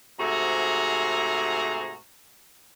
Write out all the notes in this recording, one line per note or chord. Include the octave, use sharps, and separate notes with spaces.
G#2 C3 A3 F#4 G#4 A#5